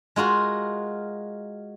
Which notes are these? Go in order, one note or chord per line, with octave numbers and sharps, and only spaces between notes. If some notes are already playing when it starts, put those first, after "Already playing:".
G#3 F4 F#4 A#4